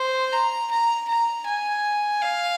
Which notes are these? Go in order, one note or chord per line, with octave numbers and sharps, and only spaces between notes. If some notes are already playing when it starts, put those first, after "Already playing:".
Already playing: C5
A#5
A#5
A#5
G#5
F5